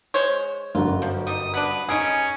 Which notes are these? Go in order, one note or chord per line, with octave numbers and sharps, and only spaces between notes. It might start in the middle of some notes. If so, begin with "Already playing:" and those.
G#3 C5 C#5
G1 F#2 F4 F#4
F3
G3 D#4 D#6
B3 D4 B4
C#4 D#4 G#4 G#5 D7